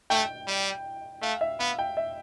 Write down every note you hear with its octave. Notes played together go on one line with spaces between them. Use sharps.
A3 G5
G3
A3 F5
E5
B3 F5
G5
E5